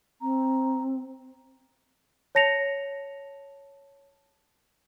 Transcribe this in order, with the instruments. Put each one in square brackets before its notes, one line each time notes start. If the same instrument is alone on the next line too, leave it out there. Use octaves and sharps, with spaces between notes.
[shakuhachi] C4 [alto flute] A#5
[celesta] C#5 A5 A#6 C#7 F7